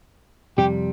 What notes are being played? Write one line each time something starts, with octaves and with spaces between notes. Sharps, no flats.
F2 C3 G3 G4